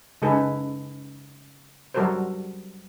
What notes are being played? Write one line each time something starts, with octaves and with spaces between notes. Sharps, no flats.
C#3 G#3 D#4 G#4 A4 B4
F#3 G3 F#4 A4 A#4 C5